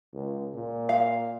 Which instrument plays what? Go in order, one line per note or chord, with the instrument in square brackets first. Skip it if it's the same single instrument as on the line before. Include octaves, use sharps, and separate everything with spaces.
[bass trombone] C#2
A#2
[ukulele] F5